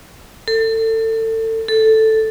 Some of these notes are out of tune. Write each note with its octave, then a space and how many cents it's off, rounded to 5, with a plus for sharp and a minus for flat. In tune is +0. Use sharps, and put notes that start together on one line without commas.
A4 +30
A4 +0